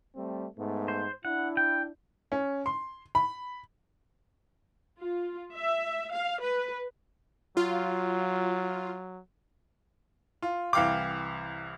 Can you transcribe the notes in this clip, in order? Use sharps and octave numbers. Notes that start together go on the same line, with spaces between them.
G3 A3 C4
G#2 A3 B3
C5
D4 E4 F#5
G5
C#4
C6
B5
F4
E5
F5
B4
F#3 F4
F4
C2 E3 F5 G5 D6